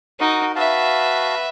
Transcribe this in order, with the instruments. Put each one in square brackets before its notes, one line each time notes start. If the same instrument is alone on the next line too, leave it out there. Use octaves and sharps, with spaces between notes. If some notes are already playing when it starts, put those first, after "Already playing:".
[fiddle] D#4 [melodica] F#4 A#4
[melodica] F#4 F5 A5 [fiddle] B4 E5